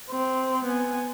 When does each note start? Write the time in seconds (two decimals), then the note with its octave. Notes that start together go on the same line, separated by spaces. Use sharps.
0.11 C4
0.65 B3 G#5